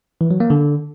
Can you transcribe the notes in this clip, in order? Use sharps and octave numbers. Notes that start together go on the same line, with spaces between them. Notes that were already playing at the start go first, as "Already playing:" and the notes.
E3
F#3
A#3
D3